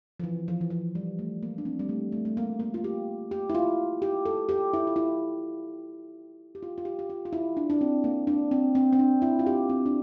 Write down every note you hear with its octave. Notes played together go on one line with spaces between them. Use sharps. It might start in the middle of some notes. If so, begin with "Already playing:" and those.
F3
E3
F3
E3
F3
G3
A3
A#3
D4
C4
G3
A3
A3
A3
A#3
A#3
F4
G4
G4
E4
F4
G4
A4
G4
E4
F4
E4
G4
F4
F4
G4
G4
F4
F4
E4
D4
D4
C4
A#3
D4
C4
C4
C4
D4
E4
F4
G4
C4
D4